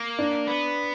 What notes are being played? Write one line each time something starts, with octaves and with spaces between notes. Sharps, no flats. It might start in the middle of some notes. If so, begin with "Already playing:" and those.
Already playing: A#3
D4
B3